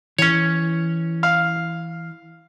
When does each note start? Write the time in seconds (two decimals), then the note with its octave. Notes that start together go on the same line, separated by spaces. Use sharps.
0.19 E3 C#4 C#5
1.23 F5